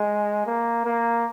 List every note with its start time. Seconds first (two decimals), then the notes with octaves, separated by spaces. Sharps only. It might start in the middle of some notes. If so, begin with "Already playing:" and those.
Already playing: G#3
0.46 A#3
0.85 A#3